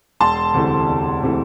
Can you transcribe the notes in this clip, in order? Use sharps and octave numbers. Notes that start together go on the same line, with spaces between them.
E1 A5 C6
D2 C3 E3 A3
E1
C3 E3 A3